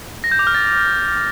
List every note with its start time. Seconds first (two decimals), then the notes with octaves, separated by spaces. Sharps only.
0.24 A#6
0.32 G6
0.39 D6
0.47 F6
0.55 A6